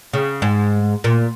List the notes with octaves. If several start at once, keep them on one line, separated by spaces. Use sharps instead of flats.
C#3
G#2
A#2